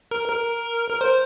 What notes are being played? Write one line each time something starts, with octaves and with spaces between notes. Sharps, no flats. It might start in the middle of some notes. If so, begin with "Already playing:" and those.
A#4
A#4
A#4
C5